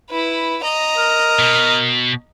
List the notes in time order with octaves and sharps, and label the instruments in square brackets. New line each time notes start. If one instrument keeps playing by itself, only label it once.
[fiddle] E4 B4
D#5 A#5
[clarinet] A#4
[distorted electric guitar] B2